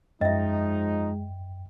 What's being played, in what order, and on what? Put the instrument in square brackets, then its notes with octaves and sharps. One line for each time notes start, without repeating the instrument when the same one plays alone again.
[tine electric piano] F#2 G5 [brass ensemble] F3 D#4 [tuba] G#3 [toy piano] D#5 E5